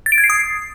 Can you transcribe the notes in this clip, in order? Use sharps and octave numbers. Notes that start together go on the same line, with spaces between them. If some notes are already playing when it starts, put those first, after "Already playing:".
A6
D7
G#6
C7
D#6